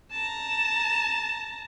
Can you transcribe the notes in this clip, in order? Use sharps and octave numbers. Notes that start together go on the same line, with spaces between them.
A5 A#5